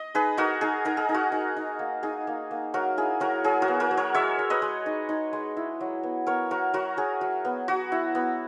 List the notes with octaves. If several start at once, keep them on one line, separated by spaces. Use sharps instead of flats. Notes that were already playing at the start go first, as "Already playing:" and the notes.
Already playing: D#5
D#4 G#4 B4
D#4 F#4 A#4
D#4 G#4
D#4 A#4
G#4
D#4
F#4
D#4
D#4
A#3
D#4 G#4
A#3
A#3
F#3 F#4 A#4
E4 G#4
F#3 F#4 A#4
F#3 G#4
F#4 A#4
B3
F#4 A#4
F#3
A#4 C#5
G#3 C#5 E5
G#3
B4 D#5
G#3
D#4
D#4
G#3
E4
F#3
B3
B3 A#4 C#5
F#3 F#4 A#4
F#3 F#4 A#4
F#3 G#4
F#3
B3
F#3 F#4
E4
B3